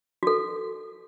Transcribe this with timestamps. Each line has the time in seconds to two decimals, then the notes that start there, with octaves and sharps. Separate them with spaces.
0.23 F#4 A4